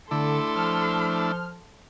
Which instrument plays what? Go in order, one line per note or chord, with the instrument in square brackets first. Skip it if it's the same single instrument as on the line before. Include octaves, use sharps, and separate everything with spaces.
[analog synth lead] D3 [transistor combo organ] A3 D4 E4 [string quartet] A4 C6
[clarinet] F3 [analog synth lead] F6